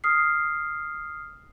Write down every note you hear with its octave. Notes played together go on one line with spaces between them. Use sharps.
D#6 F6 C7